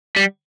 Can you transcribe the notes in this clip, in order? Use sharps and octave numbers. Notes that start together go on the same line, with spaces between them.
G3